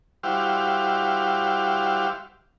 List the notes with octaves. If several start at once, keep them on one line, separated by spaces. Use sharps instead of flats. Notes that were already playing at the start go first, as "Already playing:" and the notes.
G3 E4 F#4 G4 C5 F5